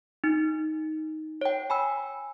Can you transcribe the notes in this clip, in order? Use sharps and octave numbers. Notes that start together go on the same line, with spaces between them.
D#4
C#5 G5
G#5 B5 E6